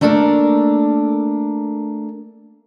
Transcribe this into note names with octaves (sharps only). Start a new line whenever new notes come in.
A3 A#3 D4 A4 A#4